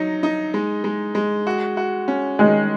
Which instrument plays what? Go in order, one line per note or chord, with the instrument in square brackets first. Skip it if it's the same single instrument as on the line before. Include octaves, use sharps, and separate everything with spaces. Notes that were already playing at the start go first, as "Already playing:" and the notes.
Already playing: [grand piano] F#3 D#4
D#4
G#3
G#3
G#3
F#4
F#4
C#4
[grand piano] D#3 [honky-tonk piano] G#3